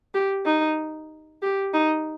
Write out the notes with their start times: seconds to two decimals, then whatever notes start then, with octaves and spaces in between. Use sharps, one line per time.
0.14 G4
0.45 D#4
1.42 G4
1.73 D#4